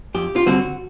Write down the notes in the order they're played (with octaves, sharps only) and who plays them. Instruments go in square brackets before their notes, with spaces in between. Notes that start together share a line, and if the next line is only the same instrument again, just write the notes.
[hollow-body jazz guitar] F2 G4
F4
D3 G3 C4 F#4